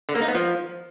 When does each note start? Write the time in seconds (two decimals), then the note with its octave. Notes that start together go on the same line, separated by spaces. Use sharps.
0.09 D3
0.15 A#3
0.22 D#4
0.28 B3
0.35 F3